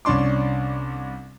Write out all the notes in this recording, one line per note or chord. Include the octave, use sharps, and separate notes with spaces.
C2 C#4 D4 C6 D6